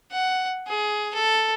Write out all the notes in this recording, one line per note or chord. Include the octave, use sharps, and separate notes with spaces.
F#5
G#4
A4